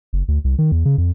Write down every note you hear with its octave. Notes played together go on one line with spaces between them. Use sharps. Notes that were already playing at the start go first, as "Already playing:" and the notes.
F#1
D2
C2
D#3
E2
C#3
F2